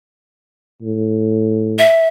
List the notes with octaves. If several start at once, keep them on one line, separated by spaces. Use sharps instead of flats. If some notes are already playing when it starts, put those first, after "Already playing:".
A2
E5